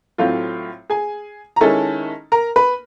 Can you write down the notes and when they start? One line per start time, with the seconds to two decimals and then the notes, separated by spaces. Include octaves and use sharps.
0.18 A2 F#3 A3 C4 F4 F5
0.90 G#4 G#5
1.56 A#5
1.61 D#3 G#3 C#4 E4 A4 A5
2.32 A#4 A#5
2.56 B4 B5